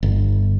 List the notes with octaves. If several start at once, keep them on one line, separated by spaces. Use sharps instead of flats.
G1